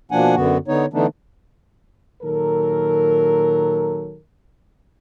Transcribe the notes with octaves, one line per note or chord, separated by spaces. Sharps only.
B2 F3 A#3 D4 F#5 G#5
F#2 D3 B3 F#4
D3 B3 D#4 C#5
D3 E3 A3 B3 D4 D#4
A#2 D#3 F#3 A4 A#4